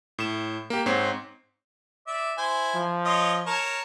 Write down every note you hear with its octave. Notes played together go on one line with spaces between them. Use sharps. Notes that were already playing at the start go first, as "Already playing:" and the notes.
A2 E7
A#3 G4
G#2 C4 C#5 C7
D5 E5
E4 C5 G#5
F3
F4 C#5 D#5
A#4 C#5 A5